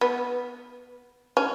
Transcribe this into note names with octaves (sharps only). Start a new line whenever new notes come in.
B3
C#4